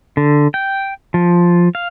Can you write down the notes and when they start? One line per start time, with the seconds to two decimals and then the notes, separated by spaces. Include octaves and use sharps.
0.17 D3
0.54 G5
1.14 F3
1.75 F5